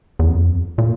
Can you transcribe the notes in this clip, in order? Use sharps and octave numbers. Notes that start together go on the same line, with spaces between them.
E2
F2
A#2